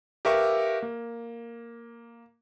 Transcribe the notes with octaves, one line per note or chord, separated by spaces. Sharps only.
G4 A#4 B4 E5 F5 C#6
A#3